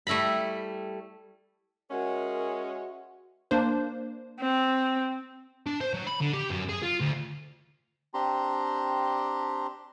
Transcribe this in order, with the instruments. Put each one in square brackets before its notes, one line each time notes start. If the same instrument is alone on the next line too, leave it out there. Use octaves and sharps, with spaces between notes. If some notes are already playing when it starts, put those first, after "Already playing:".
[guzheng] G3 A3 E4 A#5 B5
[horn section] G#3 C#4 [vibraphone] F#4 E5 F#5 [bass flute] A#4
[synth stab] A#3 D4 C5
[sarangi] C4
[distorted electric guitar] D4
C5
F#3
B5
D3
G4
F#2
G#4
F4
D2
[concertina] C4 D4 G4 A#5 C6